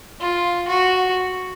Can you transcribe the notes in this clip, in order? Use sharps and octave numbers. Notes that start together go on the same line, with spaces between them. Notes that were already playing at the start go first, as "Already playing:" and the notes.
F4
F#4